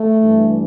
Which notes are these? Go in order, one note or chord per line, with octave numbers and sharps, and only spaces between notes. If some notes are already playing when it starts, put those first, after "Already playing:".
Already playing: A3
G2 E3